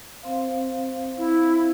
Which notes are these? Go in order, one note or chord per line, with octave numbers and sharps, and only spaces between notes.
C4 C5 F5
E4